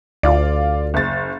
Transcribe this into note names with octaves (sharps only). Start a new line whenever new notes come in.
D2 F4 D5
F#1 A6